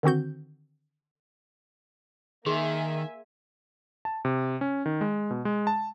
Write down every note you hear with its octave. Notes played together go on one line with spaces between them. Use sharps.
D3 D#3 C4 F#4 G6
D#3 A#3 G#4 E5 G#5 C6
A5
C3
C#4
D#3
G#3
B2
G#3
A5